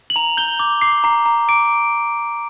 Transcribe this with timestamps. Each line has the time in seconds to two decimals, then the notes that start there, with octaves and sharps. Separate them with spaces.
0.10 F#7
0.16 A#5 F7
0.37 G6 G7
0.60 D6
0.81 D6 C7
1.04 A#5 C7
1.26 A#5
1.49 D6 D7